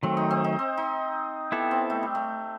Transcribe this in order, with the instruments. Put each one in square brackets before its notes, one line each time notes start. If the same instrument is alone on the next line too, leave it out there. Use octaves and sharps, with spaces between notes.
[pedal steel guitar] D#3 F#3 A3 [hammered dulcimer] C4
[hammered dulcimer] D#4
C4
D#4
C4
D#4
[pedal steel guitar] B3 E4 A4 [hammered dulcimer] G4
[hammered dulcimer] C4
A3
G3
A3